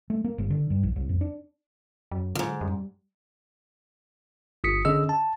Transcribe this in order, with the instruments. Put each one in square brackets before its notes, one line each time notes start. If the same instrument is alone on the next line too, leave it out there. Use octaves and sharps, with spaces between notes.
[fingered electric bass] A3
A#3
G1
D3
G2
A#1
C2
F2
D4
[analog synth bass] F#2 [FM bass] F#3
[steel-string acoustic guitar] F2 G#2 [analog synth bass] D3
[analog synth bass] F#2 [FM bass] G3
[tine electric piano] G1 D#6 B6 C#7
D3 C#4 G#4 D#5 E6
A5